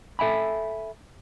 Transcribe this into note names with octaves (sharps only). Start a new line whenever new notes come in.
A4 E5 G#5 B5